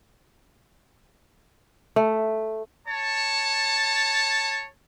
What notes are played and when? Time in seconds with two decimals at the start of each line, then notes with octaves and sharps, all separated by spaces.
1.96 A3
2.87 C#5 A5